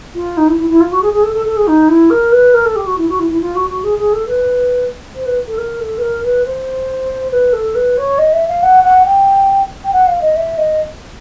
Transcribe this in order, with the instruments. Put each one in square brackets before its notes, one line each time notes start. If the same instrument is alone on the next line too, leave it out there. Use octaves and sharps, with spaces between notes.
[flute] F4
D#4
E4
E4
E4
F4
F#4
G#4
G#4
A4
A4
A4
G#4
D#4
E4
A#4
B4
A#4
A4
G4
F#4
E4
F#4
E4
E4
F4
F#4
F#4
G#4
G#4
A4
B4
C5
B4
A4
A#4
A4
B4
A#4
B4
C5
B4
A4
B4
C#5
D#5
E5
F5
F#5
F#5
G5
G5
F#5
F5
D#5
E5
D#5